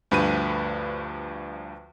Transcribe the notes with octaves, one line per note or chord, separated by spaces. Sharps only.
D2 G2 F3 B4 B5 D#7